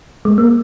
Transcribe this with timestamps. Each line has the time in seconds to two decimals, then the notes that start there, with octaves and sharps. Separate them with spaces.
0.25 G#3
0.38 A#3